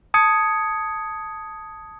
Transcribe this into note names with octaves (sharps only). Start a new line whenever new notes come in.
A5 D#6 G#6 C#7